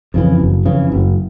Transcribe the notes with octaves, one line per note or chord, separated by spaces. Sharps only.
F2 C#3 E3
F#1
F2 C#3 E3
F#1